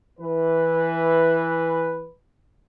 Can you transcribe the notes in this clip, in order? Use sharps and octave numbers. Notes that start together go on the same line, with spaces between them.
E3 B4